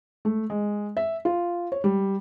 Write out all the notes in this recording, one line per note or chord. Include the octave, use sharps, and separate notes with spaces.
A3
G#3
E5
F4
C#5
G3